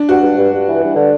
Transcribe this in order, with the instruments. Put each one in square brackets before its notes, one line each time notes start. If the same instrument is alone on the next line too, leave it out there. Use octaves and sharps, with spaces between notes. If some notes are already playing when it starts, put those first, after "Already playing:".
Already playing: [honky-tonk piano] D4
[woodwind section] G2 [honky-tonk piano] F#4
[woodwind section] G2
G2
G2
E3
G2
D3